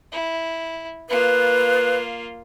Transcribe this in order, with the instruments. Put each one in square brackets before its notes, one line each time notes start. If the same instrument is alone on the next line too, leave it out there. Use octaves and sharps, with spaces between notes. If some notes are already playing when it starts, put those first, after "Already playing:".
[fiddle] E4
[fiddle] A#3 F4 [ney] B4